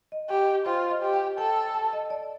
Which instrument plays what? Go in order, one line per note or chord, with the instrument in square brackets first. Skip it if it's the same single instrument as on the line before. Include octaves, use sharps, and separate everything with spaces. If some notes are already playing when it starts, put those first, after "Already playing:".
[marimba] D#5
[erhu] G4 [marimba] D#5
[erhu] F4 [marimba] C5
[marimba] D#5
[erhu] G4
[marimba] G5
[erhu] A4 [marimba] G5
[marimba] A5
A5
D#5
D5